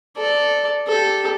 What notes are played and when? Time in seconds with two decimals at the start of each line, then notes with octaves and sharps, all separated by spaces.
0.17 A4 D5
0.87 G4 A4